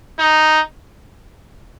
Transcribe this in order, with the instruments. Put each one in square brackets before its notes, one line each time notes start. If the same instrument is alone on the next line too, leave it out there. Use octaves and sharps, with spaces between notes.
[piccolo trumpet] D#4